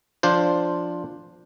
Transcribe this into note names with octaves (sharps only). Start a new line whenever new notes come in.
F3 D4 F4 C5